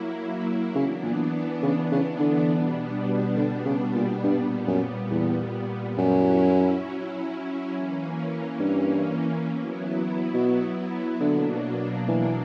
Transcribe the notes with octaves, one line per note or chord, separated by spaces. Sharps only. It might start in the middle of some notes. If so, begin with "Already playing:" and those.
Already playing: F#3 A#3 E4
C#3 E3 B3 D4
A#2
C#3
C#3
D3
B2 G3 B3 D4
D3
C#3
A#2
G2 A#2 G3 B3
F#2
E2
F#2 F#3 C#4 E4
E3 A#3 C#4
G2
F#3 B3 E4
B2
B2 D3 F#3 A#3 D4
E3